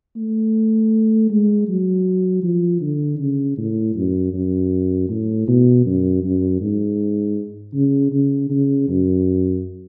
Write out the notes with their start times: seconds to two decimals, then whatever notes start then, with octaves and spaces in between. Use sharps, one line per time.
0.16 A3
1.30 G#3
1.68 F#3
2.43 F3
2.81 D3
3.19 C#3
3.58 A2
3.96 F#2
4.33 F#2
5.09 A2
5.48 B2
5.85 F#2
6.23 F#2
6.61 G#2
7.74 C#3
8.12 C#3
8.50 C#3
8.88 F#2